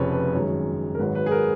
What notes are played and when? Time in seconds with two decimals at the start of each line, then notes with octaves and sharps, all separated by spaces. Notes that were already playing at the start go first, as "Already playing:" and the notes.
Already playing: F1 F2 C#3 F3 B4 C#5
0.12 B4
0.34 G#1 F#2 D#3 G#3 C#5
0.95 A#4
0.99 G#1 G#2 F#3 B4
1.15 B4
1.26 G#4
1.31 A#4